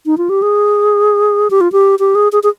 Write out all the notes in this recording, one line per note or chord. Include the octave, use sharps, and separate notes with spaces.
D#4
F4
G4
G#4
G4
F4
G4
G4
G#4
G#4
G#4